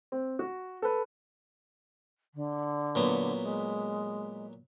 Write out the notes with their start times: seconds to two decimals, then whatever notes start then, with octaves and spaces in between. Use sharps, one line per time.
0.12 C4
0.39 F#4
0.82 A4 B4
2.35 D3
2.95 A#2 F#3 B3
3.42 G#3